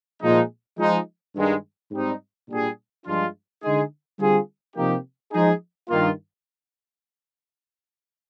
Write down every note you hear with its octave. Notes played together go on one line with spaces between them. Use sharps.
A#2 F3 G#3 D#4
F3 G#3 D#4
G2 D#3 G#3
G#2 G3 C4 D#4
A#2 G3 D4 G#4
G2 F3 G#3 D4 F4
D3 G#3 D#4 G#4
D3 G3 C4 F4 G#4
C3 F3 A#3 D#4 G4
F3 G#3 D#4 G#4
G2 D#3 A#3 F4